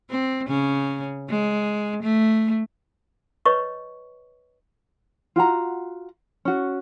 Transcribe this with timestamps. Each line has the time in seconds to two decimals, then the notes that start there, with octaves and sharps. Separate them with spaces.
0.10 C4
0.48 C#3 C#4
1.30 G#3
2.03 A3
3.45 B4 C#5 D#5 C#6
5.36 F4 F#4 F#5 A#5
6.45 C#4 F#4